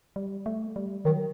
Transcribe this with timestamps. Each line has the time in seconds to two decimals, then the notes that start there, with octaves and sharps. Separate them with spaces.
0.16 G3
0.46 A3
0.76 G3
1.05 D#3 F#3